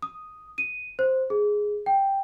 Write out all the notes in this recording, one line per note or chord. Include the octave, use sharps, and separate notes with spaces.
D#6
D#7
C5
G#4
G5